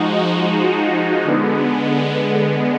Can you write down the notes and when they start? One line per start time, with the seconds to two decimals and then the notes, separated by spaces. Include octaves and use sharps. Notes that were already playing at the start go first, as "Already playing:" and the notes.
Already playing: F3 G#3 D#4 F#4
1.25 D3 G#3 B3